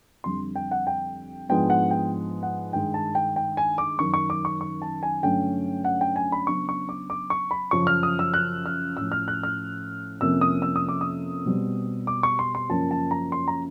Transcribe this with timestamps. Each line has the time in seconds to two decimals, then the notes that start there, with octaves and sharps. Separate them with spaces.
0.24 F2 D3 G3 C6
0.56 G5
0.71 F#5
0.87 G5
1.49 G#2 F3 G#3 B3 D4 G5
1.70 F#5
1.91 G5
2.43 F#5
2.73 G2 D#3 G#3 G5
2.94 A5
3.15 G5
3.36 G5
3.57 G#5
3.78 D6
3.98 F#2 D#3 F#3 C#6
4.14 C#6
4.30 D6
4.45 C#6
4.61 C#6
4.82 A5
5.03 G#5
5.23 G2 D3 F#3 A3 C#4 G5
5.85 F#5
6.01 G5
6.16 G#5
6.32 B5
6.47 C#3 F#3 B3 D4 C#6
6.69 C#6
6.89 D6
7.10 D6
7.30 C#6
7.51 B5
7.71 F#2 C#3 F3 C#6
7.87 F6
8.03 D#6
8.19 E6
8.34 F#6
8.66 F6
8.97 A2 F3 A3 C#4 E6
9.12 F6
9.28 F#6
9.43 F6
10.21 F2 C3 F3 A#3 C#4 E6
10.41 D#6
10.62 E6
10.76 D#6
10.89 D6
11.01 D#6
11.46 B2 G3 C4
12.07 D6
12.23 C#6
12.39 C6
12.55 C6
12.70 F#2 C#3 F3 A#3 C#4 A5
12.91 A5
13.11 A#5
13.32 C6
13.48 A#5